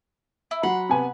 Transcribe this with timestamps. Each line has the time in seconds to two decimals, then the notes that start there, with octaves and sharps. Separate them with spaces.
0.51 E4
0.63 F#3 F#5 B5 C6
0.89 C3 B3 G#5